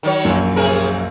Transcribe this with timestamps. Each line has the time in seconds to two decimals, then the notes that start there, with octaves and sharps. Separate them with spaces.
0.03 D#3 F#3 C#5
0.25 A#1 F#2
0.56 C3 G#4 A#4